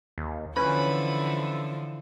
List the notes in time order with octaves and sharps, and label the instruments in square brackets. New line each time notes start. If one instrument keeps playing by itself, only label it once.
[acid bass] D#2
[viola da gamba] D3 E3 F3 [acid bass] C#4 [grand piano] B4 [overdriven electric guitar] B5